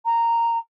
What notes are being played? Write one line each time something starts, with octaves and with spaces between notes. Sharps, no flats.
A#5